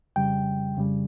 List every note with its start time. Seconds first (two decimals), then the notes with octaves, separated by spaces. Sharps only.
0.16 F2 C#3 G3 G5
0.77 F2 C#3 G3